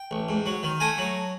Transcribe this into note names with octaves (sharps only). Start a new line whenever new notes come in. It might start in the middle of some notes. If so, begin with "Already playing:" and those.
Already playing: G5
A1
G#2
F#3
D#3
A3 G#5 A#5
F#3